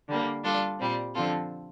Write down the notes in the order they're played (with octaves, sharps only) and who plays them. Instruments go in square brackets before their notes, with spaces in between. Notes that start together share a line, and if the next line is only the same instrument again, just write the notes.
[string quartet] D3 G3 A#3
G3 D4 F4 A4
A#2 G3 C4
D3 F3 C4 F4 A4